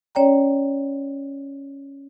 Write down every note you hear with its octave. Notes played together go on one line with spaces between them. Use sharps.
C#4 C#5 D5 G5 A#5